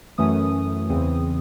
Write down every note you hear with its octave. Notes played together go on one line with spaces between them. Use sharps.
F#2 E3 A3 C#4 D#6
E2 C#3 E3 C4